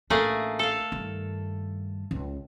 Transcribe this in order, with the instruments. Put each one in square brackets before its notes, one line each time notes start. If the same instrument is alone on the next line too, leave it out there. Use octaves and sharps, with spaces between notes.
[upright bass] A1 D4 [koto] A3 A#3 G#4
[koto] A4 F5
[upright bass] G2 D#3
C#2 C#3